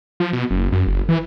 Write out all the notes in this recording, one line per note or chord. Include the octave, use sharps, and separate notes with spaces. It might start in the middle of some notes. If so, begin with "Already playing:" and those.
F3
B2
F#1
F#2
F#1
E3